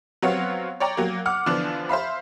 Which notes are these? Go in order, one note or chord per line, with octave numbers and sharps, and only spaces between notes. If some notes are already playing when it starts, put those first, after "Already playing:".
F#3 B3 C4 C#5 F5 F#5
C#5 D5 G5 A#5
F#3 A#3
F#5 D6 F6
D3 E3 F3 B3 D4
C5 E5 F5 B5